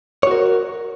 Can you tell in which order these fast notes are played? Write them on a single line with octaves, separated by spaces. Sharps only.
C#5 F#4 A#4